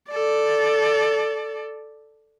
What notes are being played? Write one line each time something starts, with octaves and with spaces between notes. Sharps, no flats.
A4 D5